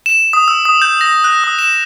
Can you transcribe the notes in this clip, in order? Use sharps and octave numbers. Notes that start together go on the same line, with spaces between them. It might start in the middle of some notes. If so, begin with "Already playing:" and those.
E7
D#6
E6
D#6
G6
A#6
F#6
D#6
E7